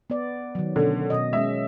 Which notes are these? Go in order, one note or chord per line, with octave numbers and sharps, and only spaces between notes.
B3 D5
D#3 F#3
B2 D3 C#4
B2 D#5
G#3 C#4 E5